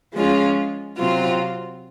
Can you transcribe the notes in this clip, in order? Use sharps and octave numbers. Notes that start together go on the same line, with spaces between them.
F3 G#3 C#4 F4
C3 F#3 C4 F4